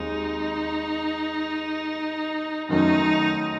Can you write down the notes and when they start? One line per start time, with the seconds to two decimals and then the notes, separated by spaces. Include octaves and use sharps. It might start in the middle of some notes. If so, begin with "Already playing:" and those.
Already playing: D#2 D#3 G#3 C4 D#4
2.69 F#2 D#3 F#3 A3 C#4 D#4